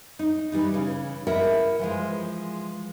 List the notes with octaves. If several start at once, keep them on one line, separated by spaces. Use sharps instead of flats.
D#4
E3 G3 D#4
C#3 E3
E4 A#4 B4 D#5 E5 F#5
E3 F3 G#3